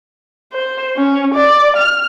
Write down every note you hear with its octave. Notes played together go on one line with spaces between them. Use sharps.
C5
C#4
D5
F6